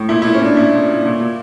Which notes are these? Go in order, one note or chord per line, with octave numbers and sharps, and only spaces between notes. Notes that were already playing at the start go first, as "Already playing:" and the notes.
Already playing: A2
A#2 E4
A#2 E4
C#4
A#2 D4
A#2 E4
A#2
A#2
A#2
A#2